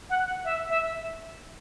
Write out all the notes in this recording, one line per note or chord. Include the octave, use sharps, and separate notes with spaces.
F#5
E5
E5